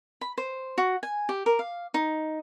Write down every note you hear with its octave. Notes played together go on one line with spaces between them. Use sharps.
B5
C5
F#4
G#5
G4
A#4
F5
D#4